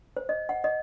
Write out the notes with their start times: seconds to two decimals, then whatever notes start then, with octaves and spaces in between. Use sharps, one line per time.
0.17 C5
0.29 D#5
0.49 F#5
0.64 D#5